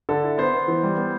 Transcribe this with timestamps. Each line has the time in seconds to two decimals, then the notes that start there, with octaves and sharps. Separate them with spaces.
0.09 D3 A4
0.24 E4
0.38 B3 C5
0.54 B3
0.68 E3
0.83 G3
0.97 B3